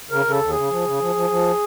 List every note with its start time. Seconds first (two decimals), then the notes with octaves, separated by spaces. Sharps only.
0.10 C#3 A#4
0.26 C#3 A4
0.41 D#2
0.50 G#4
0.55 C#3
0.70 F3
0.85 C#3
1.00 F3
1.15 F3
1.30 F3